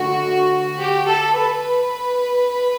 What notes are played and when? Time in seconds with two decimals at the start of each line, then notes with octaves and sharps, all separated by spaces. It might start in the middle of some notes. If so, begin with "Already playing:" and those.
Already playing: D3 A3 F#4
0.79 G4
1.08 A4
1.38 B4